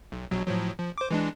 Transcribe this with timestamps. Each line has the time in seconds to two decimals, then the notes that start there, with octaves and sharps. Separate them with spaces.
0.12 B1
0.31 A#1 B2 F#3
0.46 A2 F3 F#3
0.79 F3
0.98 C5 D6
1.11 E3 G#3 D4